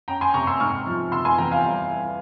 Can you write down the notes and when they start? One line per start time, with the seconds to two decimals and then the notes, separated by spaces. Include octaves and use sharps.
0.08 C#4 G5 A#5
0.21 G#5 C6
0.34 C3 A#5 C#6
0.47 C6 E6
0.60 G#2 C#6 F6
0.86 F3
1.12 C3 C6 E6
1.25 G#5 C6
1.38 E2 G5 A#5
1.51 F5 G#5
1.64 G3
1.90 E4